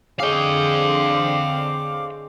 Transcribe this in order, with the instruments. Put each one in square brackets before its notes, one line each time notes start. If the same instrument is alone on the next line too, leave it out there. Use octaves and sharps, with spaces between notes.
[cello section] D3 C4 [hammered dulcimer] G#4 C#5 D#5 [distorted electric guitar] F5 G5 [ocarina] D6